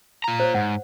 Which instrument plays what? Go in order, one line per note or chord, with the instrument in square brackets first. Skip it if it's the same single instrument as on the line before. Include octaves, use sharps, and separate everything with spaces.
[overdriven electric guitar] F4 A#5
[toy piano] C5 C#5
[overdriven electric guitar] G#2 [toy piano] F#5